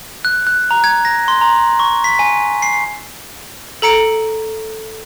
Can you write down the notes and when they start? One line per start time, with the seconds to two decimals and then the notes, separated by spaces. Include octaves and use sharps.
0.25 F#6
0.47 F#6
0.71 A#5
0.84 G#6
1.05 A#6
1.28 C6
1.41 A#5
1.80 C#6
2.04 B6
2.19 G#5
2.62 C7
3.82 A4 A#5 C#7 D7